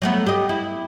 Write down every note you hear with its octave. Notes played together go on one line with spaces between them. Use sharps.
F#3 A3 B3
G4 D#5
E4